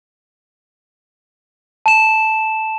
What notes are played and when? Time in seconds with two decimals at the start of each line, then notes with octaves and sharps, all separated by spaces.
1.86 A5 E7